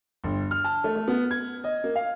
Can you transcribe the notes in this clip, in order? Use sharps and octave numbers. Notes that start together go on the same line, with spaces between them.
G1
F6
A5
A3
A3
B3
G#6
D#5
A#3
F5